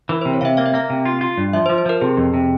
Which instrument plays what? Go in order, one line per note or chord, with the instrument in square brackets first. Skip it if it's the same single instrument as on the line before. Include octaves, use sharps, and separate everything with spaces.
[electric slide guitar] E3 [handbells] A#4
[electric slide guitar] C3 [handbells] C5
[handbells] C#5
[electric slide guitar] C3 [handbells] E5 F5
[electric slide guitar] A#3 [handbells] F5
[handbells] E5
[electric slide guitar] A#3 [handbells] F5
[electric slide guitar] C3
F4
F4
G2
[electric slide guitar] F3 [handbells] E5
[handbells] C5
[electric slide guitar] F3
[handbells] C5
[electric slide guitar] F3 [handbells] A#4
[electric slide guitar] C3 [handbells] G#4
[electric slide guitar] F2
C3